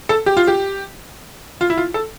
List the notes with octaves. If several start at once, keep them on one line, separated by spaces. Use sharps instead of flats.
A4
G4
F4
G4
F4
E4
F4
A4